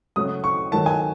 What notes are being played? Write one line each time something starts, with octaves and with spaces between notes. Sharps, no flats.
C#3 F#3 A3 D#6
C#6
D#3 F#3 A3 A5
G#5